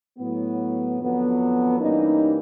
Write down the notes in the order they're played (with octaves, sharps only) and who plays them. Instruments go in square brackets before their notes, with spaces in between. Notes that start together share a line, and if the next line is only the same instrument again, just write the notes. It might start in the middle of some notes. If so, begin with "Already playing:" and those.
[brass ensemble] A2 F#3 B3
F2 D3 F#3 B3
G2 E3 G3 A#3 C#4 D#4